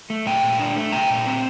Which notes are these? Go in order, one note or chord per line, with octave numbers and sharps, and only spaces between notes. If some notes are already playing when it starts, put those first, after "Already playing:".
A3
A#2 G5 A#5
A#2
D4
A3
A#2 G5 A#5
A#2
C4